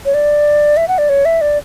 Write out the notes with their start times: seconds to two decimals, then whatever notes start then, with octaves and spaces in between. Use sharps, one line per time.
0.06 C#5
0.14 D5
0.77 E5
0.88 F#5
0.98 D5
1.09 C#5
1.25 E5
1.41 D5